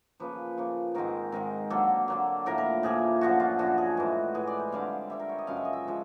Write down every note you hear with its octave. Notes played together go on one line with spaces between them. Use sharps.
C#3 F3 A#3 B4
C#3 F3 A#3
G#2 D#3 G#3 C4 A#4
G#2 D#3 G#3 C4 A#4
D3 F#3 A#3 A4
D3 F#3 A#3
A2 F3 A#3 A#4
A#4
A2 F3 A#3 G#4
F#2 D3 F3 F#4
F4
F#2 D3 F3 F#4
G#4
A2 E3 G#3
A2 E3 G#3 G#4
D5
C5
D3 G3 C4 F5
D3 G3 C4 E5
A#4
C#5
D#5
F#2 C#3 F3 G#3 F5
E5
D#5
E5
C#3 F3 G#3